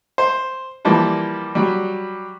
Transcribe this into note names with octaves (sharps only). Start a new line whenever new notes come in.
C5
E3 F3 G3 A#3
F#3 G3